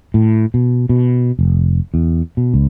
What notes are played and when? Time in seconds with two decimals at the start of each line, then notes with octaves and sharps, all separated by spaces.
0.14 A2
0.54 B2
0.89 B2
1.39 F1
1.94 E2
2.37 B2
2.54 C#2